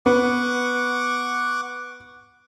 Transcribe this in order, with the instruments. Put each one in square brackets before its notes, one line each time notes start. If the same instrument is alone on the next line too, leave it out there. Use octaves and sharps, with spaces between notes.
[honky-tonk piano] B3 [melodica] F#5 C#6 D6